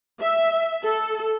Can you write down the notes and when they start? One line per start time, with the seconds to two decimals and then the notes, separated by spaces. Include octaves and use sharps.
0.21 E5
0.84 A4